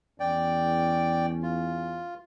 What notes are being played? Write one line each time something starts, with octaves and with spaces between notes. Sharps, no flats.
E2 C#4 D5 G5
F4